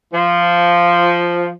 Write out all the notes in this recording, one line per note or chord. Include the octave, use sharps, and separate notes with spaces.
F3